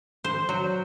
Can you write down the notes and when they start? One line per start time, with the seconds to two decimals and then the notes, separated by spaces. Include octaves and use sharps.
0.24 C5
0.49 F#3